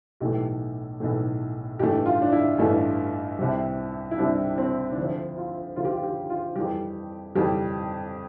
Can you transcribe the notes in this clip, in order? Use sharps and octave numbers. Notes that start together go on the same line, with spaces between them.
B1 A2 E3 A3 G4
B1 A2 E3 A3
A1 G2 E3 A3 G4
F4
D4
E4
A1 G2 E3 A3
C2 C3 G3
E4
C2 C3 G3 D4
C4
D4
D2 D3 F3 E4
F4
D2 D3 F3 F4
G4
F4
G4
F4
F2 E3 G3 G4
F2 E3 G3 G4